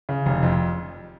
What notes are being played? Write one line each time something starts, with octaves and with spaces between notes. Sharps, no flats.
C#3
F1
F2